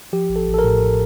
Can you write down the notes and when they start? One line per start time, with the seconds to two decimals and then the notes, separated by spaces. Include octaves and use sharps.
0.13 F3 G4
0.30 A1
0.36 A4
0.47 A1
0.54 A4
0.59 A#4
0.64 A2